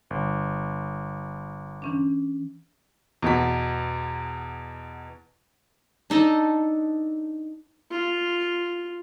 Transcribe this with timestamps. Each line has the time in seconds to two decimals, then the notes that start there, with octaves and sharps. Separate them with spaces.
0.10 G1
1.82 E3 C#4 D4
3.22 E2 B2 F#4 B6
6.10 D4 D#4 A4 D#5
7.91 F4